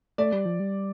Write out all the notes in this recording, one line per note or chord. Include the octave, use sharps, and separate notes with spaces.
A3 D5
G3
F3
G3